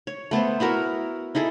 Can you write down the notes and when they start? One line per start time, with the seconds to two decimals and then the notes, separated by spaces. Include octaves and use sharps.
0.07 C#5
0.31 A3 B3 A4 C5
0.60 B3 E4 F#4 A#4
1.35 D#4 E4 G#4 A4